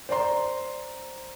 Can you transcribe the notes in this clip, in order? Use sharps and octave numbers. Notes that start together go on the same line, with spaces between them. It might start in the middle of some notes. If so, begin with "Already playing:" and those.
C5 D5 A#5 C6